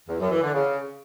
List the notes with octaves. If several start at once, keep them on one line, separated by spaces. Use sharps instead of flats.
E2
F#2
E3
D3
C#3